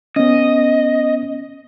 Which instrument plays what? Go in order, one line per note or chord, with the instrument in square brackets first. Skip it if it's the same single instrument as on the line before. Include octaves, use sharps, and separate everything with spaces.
[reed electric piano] B3 C#4 [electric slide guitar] D#5